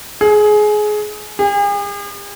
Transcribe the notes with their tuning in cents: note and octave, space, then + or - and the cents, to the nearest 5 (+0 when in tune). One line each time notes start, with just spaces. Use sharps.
G#4 +20
G#4 -45